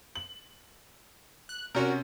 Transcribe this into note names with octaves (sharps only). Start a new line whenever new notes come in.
F#7
F#6
C3 C#4 F#4 A#4